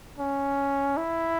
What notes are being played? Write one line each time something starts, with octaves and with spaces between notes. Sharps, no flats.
C#4
E4